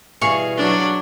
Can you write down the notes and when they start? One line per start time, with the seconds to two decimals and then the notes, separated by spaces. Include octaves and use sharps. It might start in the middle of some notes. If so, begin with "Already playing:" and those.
0.21 B2 E3 G3 G#4 F5 C#6
0.57 F#3 D4